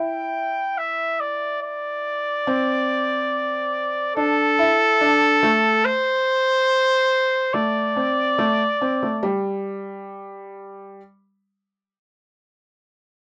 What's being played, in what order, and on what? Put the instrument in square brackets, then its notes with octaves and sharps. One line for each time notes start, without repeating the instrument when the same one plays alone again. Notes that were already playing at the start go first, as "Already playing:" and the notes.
Already playing: [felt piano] E4 [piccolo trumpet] G5
[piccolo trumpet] E5
D5
D5
[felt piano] C4
[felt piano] D4 [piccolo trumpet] A4
[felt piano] E4
D4
A3
[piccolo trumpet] C5
[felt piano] A3 [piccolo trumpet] D5
[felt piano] C4
A3
C4
A3
G3